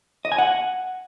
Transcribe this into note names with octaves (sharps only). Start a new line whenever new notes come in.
D#5
G#5
F#5